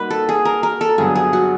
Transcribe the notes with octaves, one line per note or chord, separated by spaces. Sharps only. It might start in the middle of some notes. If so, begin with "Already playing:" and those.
Already playing: G3 A#3 D#4 F#4 B4
A4
G#4
A#4
A#4
A4
G2 D3 F#3 B3 G#4
G#4
F#4